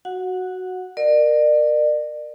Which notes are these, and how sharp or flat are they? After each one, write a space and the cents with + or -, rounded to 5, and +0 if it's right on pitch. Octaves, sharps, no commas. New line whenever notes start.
F#4 +0 F#5 -20
A#4 +0 D5 +35